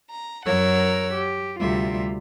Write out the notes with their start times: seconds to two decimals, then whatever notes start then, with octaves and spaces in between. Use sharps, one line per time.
0.11 A#5
0.45 F#2 A#4 C#5 F#5 E6
1.14 G4
1.60 D2 C3 G3 F4 E5